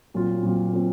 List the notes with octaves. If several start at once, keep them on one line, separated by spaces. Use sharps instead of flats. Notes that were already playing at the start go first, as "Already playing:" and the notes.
A#2 F#3 C4 F4
A#2 F#3 C4 F4
A#2 F#3 C4 F4